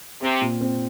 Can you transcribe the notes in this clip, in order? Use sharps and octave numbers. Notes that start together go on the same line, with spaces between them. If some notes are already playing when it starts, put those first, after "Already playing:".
C3 C4
A#2
C4